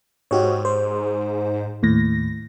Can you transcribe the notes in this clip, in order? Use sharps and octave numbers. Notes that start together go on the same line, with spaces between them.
G#2 F#4 G4 C#5
C5
D#2 A2 A#6